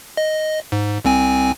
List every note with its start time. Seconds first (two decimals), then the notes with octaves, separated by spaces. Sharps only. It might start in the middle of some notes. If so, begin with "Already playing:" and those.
0.17 D#5
0.72 G#2
1.05 C2 C4 G#5